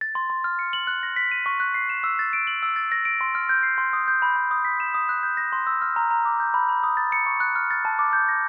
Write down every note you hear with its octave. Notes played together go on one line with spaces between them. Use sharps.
A6
C6
C6
F6
C#7
F#7
F#6
A#6
B6
D#7
C#6
F#6
C7
E7
E6
A6
D7
F#7
E6
A6
A#6
D7
C6
F6
G6
C7
C6
D#6
G6
B5
B5
D#6
B6
E7
D#6
F#6
G6
A#6
C6
E6
F6
A#5
A#5
D6
G6
B5
B5
D#6
A6
C#7
C#6
F#6
F6
A6
A5
D6
G6
A#6